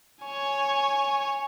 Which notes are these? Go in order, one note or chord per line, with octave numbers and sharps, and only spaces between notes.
C#5 G#5